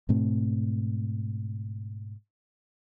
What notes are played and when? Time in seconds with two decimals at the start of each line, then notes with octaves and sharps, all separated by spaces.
0.09 G#2 B2 A3 C4